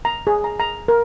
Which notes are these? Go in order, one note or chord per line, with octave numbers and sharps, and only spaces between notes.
A#5
G#4
A#5
A#5
A#4